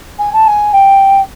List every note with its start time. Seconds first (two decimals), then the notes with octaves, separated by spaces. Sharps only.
0.18 G#5
0.32 A5
0.47 G#5
0.72 G5